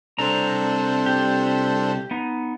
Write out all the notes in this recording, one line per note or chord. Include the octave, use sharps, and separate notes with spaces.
C2 C4 D4 A4 C5 A#5
G4
B3 D#4